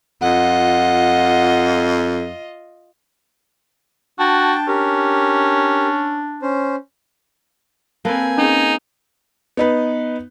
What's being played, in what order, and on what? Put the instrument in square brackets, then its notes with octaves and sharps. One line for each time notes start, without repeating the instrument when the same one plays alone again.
[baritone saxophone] F2 [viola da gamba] F4 D#5 [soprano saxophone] F#5
[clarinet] D4 [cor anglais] F#4 [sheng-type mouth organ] G5 A5
[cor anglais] C#4 [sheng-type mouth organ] G4 A#4
[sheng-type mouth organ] C#4 C5
[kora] A#3 A4 B4 [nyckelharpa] C4 G#5
[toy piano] C#4 G#4 [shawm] D#4
[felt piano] B3 D#4 B4